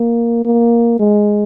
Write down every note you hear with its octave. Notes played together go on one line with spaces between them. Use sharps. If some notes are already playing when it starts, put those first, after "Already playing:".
Already playing: A#3
A#3
G#3